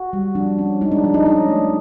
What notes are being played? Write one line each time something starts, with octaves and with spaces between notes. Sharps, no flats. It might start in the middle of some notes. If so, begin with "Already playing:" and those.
Already playing: F#4
G3
F3 D4
C#4
G#3 D#4
D4
F3 D4
D#4
C#4 D#4
A3